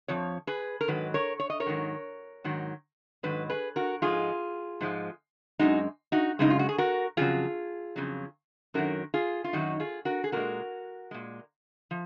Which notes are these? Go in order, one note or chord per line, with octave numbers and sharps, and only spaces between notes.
F2 F3 C#5
G#4 B4
A#4
G#2 D#3 F#3 B4
A#4 C#5
C#5
D#5
A#4 C#5
G#2 D#3 F#3
G#2 D#3 F#3
G#2 D#3 F#3 B4
G#4 B4
F#4 A#4
G#2 F3 G#3 F4 G#4
G#2 F3 G#3
F#2 C#3 G#3 D#4 F#4
D#4 F#4
F#2 C#3 G#3 D#4
F4
F#4
G#4
F#4 A#4
F2 C#3 F#3 F4 G#4
F2 C#3 F#3
F#2 D#3 F#3 F#4 A#4
F4 G#4
F4
F#2 D#3 F#3 D#4 F#4
F4 G#4
F#4 A#4
G#4
A#2 G#3 F#4 A#4
A#2 G#3
F3